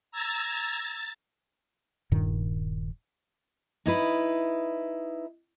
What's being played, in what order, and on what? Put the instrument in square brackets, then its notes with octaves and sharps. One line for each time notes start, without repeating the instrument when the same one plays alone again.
[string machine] A#5 E6 G#6 A6
A6
[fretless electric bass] D#1 G2 A#2 D#3
[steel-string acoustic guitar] D#4 E4 B4